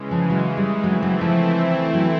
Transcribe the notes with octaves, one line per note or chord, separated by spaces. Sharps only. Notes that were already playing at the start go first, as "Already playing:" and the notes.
Already playing: C#3 E3 G#3
F3
F#3
G3
E3 F#3 A3 C4 E4
F#3
F3
F#3